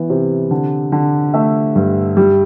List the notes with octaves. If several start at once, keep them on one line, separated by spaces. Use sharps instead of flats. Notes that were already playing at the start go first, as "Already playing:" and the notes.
Already playing: E3 B3
C3
D3
D3
A3 E5
G2
G3